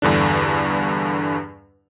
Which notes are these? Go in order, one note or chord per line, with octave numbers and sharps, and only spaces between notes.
E2 G2 D3 D4